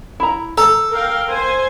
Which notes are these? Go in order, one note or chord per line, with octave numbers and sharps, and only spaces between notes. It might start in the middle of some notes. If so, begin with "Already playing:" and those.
E4 A#5
A4 A#5
A#4 F5 G5
C5 G#5